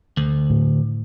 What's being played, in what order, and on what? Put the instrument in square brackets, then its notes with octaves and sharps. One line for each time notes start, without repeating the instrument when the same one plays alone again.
[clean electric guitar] D2
[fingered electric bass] A2